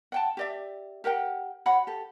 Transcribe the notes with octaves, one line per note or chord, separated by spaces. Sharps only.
F#5 G5 A5
G4 D5 E5
G4 A#4 F#5 G5
F#4 C#5 F#5 B5
G4 A4